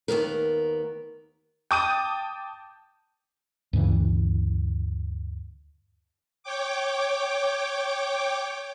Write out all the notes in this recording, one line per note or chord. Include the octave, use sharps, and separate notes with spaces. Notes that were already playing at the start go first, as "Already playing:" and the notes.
D#2 A#2 B3 A#4
G5 A5 D6 D#6 G6 D#7
D2 G2 C#3 E3
C#5 G5 D6